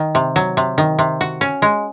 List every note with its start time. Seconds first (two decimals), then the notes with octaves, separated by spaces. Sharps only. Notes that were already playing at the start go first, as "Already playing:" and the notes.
Already playing: D#3
0.15 C3
0.36 F#3
0.57 C3
0.78 D#3
0.99 C3
1.21 F#4
1.41 C#4
1.62 G#3